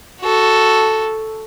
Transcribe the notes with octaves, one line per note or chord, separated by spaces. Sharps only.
F#4 A4